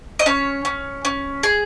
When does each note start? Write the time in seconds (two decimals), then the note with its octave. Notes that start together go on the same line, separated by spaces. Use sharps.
0.19 D#5
0.26 C#4 C#5
0.65 C#4
1.05 C#4
1.43 G#4